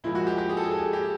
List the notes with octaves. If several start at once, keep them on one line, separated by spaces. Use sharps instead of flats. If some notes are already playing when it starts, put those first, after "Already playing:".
A#2 F3 G#3 E4
F#4
G4
G4
G#4
A4
G#4
A4
G#4
G4